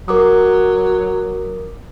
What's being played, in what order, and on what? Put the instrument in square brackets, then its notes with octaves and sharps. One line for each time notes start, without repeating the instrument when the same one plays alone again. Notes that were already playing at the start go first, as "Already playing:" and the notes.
[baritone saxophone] F#3 [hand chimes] A#4 D6 D#6